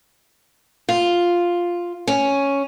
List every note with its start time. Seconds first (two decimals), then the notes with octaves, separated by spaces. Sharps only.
0.89 F4
2.07 C#4